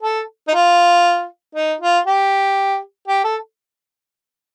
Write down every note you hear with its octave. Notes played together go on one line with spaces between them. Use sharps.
A4
D#4
F4
D#4
F4
G4
G4
A4